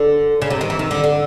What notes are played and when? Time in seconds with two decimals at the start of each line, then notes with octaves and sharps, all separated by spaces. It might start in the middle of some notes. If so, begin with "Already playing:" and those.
Already playing: D3
0.42 C#3
0.50 C3
0.61 D#3
0.70 E3
0.79 D#3
0.91 D3
1.04 D3